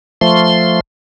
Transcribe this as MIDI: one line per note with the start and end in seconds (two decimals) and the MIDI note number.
0.21 0.80 53
0.21 0.80 57
0.21 0.80 84